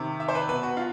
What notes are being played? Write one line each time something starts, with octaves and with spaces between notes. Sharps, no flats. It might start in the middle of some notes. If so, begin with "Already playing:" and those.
Already playing: C3 D#3
E5
C5
B4
B2 B4
F#4
F4